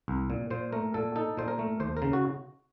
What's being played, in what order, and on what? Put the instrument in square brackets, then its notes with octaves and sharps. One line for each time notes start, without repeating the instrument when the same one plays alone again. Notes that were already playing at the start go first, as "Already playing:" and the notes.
[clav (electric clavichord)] C2
A#2
A#2 C5
A3 A#4
A#2 A4
D#4 A4
A#2 C5
A#4
A3
D#2 C5
A#4
C#3
F#4